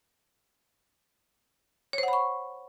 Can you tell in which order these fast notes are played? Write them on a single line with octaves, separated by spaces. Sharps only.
C#5 C5 F#5 B5 C#6